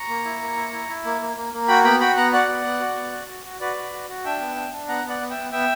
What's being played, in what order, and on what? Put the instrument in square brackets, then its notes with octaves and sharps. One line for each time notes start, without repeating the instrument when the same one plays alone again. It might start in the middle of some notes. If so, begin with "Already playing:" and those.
Already playing: [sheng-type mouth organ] A#5 C#6
A#3
E4
A#3
E4
E4
E4
A#3
A#3
A#3
A#3
F#4 G5 B5
B3 G5 B5
F#4 G5 B5
B3 F#5 A#5
F#4 D5 F#5
B3
B3
F#4
B3
F#4
F#4
F#4
F#4 B4 D5
F#4
F#4
F#4
D4 E5 G5
B3
D4
D4
B3 F#5 A#5
B3 D5 F#5
B3
E5 G5
B3
B3 E5 G5